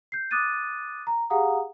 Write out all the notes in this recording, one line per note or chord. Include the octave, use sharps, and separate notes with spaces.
G6 C7
D6 D#6 F#6 A6 D#7
A#5
G4 G#4 F5 F#5 A#5 D#6